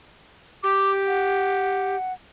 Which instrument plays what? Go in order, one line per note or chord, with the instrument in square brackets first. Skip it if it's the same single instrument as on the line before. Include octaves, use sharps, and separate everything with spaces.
[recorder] G4 [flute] D6
[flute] F#5